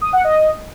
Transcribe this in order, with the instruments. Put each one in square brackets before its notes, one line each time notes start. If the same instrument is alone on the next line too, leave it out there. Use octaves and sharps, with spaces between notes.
[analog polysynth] D#6
F#5
D#5